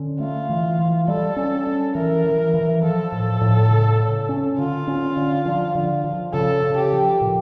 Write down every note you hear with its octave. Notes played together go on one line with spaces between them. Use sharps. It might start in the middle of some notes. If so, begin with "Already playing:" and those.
Already playing: D3 C#4
A3 F4
E3
E3
G3 A4
C#4
C#4
E3 A#4
E3
E3
F3 A4
A2
A2
C#3
C#3
C#4
D3 F4
C#4
D3
F3
D3
F3
C#3 A4
C#3
G4
F3
A#2